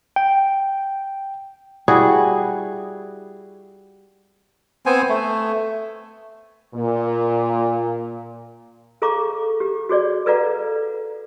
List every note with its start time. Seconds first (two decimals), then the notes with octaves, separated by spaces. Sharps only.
0.16 G5
1.88 G3 E4 F#4 G#4
4.86 B3 C4 C5 G#5
5.09 A3
6.75 A#2
9.02 G#4 A4 F5 A#5 C#6 D6
9.60 G4
9.89 F#4 G#4 C#5 D5
10.26 A4 B4 D5 F5 F#5 A#5